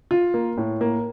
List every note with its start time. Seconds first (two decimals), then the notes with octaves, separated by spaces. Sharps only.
0.11 F4
0.34 A#3
0.57 A2
0.81 A#3